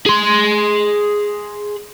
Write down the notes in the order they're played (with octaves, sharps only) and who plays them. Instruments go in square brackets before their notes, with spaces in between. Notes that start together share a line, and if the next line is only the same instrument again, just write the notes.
[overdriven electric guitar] G#4 C6